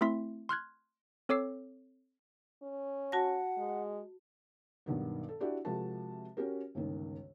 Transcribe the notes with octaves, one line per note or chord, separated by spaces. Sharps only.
A3 C4 E4 E5 C6 B6
C6 F6 F#6 G#6
C4 A4 C#5 D6 E6 C7
C#4
F#4 F#5 A5 A#6
G#3
B1 G2 D#3 B3
A4
D4 E4 F#4 G4 D5
C3 F3 G#3 F#4 A#4 A5
C#4 F#4 G4 A#4
G1 C#2 D#3